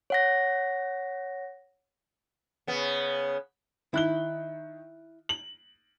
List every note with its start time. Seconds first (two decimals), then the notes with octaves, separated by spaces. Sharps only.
0.10 C#5 F#5 A#6
2.67 C#3 B3
3.94 D#3 E4 F#6 G7
5.29 F#7